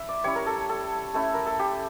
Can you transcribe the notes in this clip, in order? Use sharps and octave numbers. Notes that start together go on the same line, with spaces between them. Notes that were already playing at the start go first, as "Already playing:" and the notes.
Already playing: E4 E5
D5
G3 C#4 E4 C#5
A#4
A4
A4
A3 C#4 E4
A#4
A4
G4